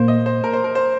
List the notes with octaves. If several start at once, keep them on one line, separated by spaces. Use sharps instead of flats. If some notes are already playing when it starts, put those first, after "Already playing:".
Already playing: A#2 A#3 C5
D#5
C5
A#4
C5
A#4
C5